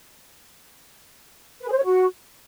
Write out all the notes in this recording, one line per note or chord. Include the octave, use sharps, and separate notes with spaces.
B4
G#4
C5
C#5
F#4